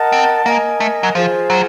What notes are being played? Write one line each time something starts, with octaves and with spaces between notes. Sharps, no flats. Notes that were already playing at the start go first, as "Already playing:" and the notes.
Already playing: A#4 D#5 F#5 A5
C4
A#3 A#4 D#5 G#5
A3
F#3
F3 F4 G#4 C5
F#3